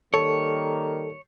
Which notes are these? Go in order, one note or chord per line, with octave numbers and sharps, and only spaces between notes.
D#3 G3 A#3 A4 C#5